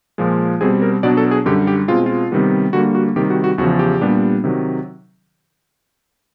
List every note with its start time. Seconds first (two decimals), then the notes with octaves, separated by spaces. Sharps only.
0.18 A#2 F3 G#3
0.61 B2 G3 C4 G#4
0.82 A#4
1.03 B2 F#3 B3 D4 D5
1.17 A4
1.31 G#4
1.45 F#2 D3 G3 G4
1.67 G4
1.88 B2 G#3 C4 F4
2.06 F4
2.31 C3 D#3 G3 B3
2.73 D3 G3 A#3 F#4
2.95 F#4
3.16 C3 D#3 G3 G4
3.30 F#4
3.44 F#4
3.58 E2 C#3 F3 F#4
3.79 G4
4.01 A#2 G3 B3 D4
4.44 C3 D#3 F#3